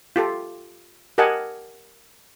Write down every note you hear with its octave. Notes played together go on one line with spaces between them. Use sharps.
F4 G4 A4
G4 A#4 D#5 F#5 G#5 A5